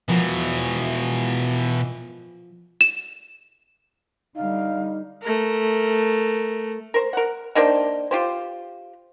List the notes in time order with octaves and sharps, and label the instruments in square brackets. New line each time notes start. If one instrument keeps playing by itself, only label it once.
[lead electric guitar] B2 E3 [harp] F3 A#4 F#5
[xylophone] E7
[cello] D3 G3 [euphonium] D#4 [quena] F5
[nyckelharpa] A3 A#4
[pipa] A#4 C5
A#4 F#5
D#3 A#3 D4 C5
F4 G4 C5